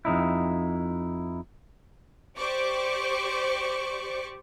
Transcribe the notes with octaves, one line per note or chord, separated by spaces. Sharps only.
F2 A#2 D#4 E4
G4 C5 D5 C#6 D6